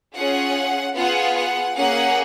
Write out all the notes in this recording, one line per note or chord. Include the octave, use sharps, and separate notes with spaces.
C#4 F4 G#4 F#5
B3 F4 G#4 F#5
F#5
A#3 C#4 G#4 F#5